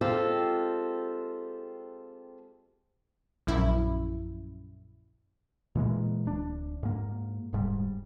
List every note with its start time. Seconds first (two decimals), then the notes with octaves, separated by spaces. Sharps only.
0.01 G#3 C4 F4 G4 A4
3.47 A#1 F#2 E4
5.75 A#2 E3 G#3 A#3
6.25 D1 D4
6.83 G#2 A#3
7.53 D#1 G#2 G3